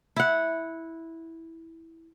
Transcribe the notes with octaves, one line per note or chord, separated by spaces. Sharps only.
E4 F#5